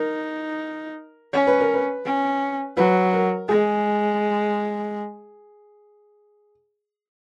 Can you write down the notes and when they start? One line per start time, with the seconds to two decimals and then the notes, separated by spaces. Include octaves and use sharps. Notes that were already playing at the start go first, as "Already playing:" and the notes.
Already playing: D#4 A#4
1.33 C#4 C#5
1.47 B4
1.60 A#4
1.74 B4
2.05 C#4
2.77 F#3 B4
3.13 A#4
3.49 G#3 G#4